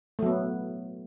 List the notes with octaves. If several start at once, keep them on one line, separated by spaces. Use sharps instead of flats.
F#3 A3 B3